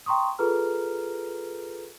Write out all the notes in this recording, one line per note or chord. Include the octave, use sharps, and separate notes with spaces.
G5 A#5 C6 C#6 D#6
F4 G#4 A4 B4 A#5 F6